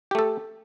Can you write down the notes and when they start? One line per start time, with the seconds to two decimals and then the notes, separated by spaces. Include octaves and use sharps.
0.11 G4
0.15 A3
0.19 A4